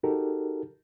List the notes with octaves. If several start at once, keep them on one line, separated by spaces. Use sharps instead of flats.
D#4 F#4 G4 A4 A#4